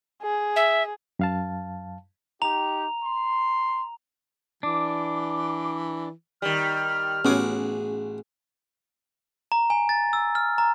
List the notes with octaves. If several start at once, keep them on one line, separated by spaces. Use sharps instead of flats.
G#4
E5
F#2 F5 A5
D#4 G4 A#5 F7
C6
E3 D4 D6
D#3 G3 F6
A1 B3 C#4 F#4 G#4 D6
A#5
G#5
A6
E6
F6
A#5